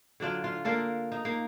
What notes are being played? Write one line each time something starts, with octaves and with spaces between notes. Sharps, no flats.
D3 F#3 D4 F4
F4
A#3 D4 F4 A4
D#4
A#3